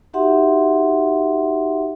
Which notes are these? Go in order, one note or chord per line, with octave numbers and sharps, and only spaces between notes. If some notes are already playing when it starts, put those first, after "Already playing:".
D#4 F#4 G4 E5 F#5 C6